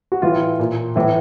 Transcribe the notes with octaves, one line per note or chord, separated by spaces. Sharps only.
F#4
A2 E3 F4
A#2
A2 E3